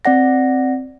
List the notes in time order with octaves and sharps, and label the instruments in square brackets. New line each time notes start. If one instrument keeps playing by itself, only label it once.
[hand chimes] C4 D5 F#5 A#6